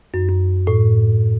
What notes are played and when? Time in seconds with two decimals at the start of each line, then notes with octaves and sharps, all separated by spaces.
0.14 F#2
0.29 F#2
0.67 A2